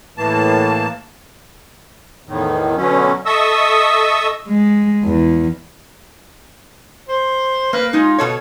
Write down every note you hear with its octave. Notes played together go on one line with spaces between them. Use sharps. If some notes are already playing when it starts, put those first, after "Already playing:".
A2 E3 A#3 A5
E2 A2 D#3
B2 D3 F#3 C#4
A4 D#5 E5 C#6 D#6 E6
G#3
E2
C5
A#3 B4
G#3 D#4 F4
B2 A4 C#5